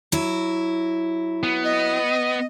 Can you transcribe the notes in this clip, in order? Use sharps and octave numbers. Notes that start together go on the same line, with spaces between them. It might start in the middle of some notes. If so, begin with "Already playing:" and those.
F#3 E4
B3
D#5